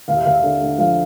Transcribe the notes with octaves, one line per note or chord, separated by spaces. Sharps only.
D#2 F5
E5
D#2 F5
E5
D3
D3
F3 F5